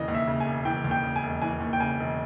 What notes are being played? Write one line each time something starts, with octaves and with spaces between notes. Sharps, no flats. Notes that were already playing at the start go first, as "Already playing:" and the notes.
Already playing: E1 C#3 E3 D#5
D#2
E5
C#3
G#5
E1
E3 G5
D#2
G5
C#3
G#5
E1
E3 G#5
D#2
G5
C#3 G#5
E1